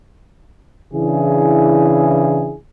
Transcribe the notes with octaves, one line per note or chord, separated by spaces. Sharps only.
C#3 E3 D4 E4 G#4